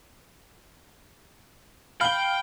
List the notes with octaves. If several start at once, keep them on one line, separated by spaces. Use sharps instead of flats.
F5 G5 B5 G7